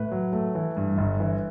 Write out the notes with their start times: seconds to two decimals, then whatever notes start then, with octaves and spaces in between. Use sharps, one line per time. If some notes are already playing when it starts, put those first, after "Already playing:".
Already playing: A2 B4
0.12 F#3
0.33 A3
0.55 E3
0.77 G2
0.98 G1
1.20 E3